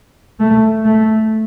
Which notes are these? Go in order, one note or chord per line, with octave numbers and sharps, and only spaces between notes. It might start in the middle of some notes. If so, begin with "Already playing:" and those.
A3
A3